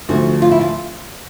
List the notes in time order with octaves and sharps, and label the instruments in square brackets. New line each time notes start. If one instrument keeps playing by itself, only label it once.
[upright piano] D2 D3 F3 A3 [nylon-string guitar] F#4
[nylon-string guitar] F4
E4
F4